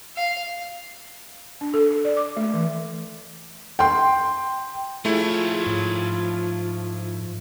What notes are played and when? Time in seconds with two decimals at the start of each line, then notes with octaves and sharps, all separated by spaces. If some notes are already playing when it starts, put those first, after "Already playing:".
0.16 F5
1.61 D4
1.74 A4
1.90 A4
2.05 D5
2.17 D6
2.37 A3
2.53 E3
3.79 G5 C6
5.05 F3 A3 E4 F4 G#4 C#5
5.66 G#2 F4